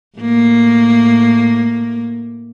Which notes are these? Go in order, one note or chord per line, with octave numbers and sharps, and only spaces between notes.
A2 A#3